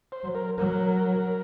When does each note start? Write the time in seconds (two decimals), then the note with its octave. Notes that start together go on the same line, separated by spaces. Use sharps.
0.12 C5
0.23 F#3
0.35 A#4
0.58 F#3 A#4